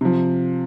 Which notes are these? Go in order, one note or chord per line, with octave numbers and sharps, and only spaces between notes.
C3 F3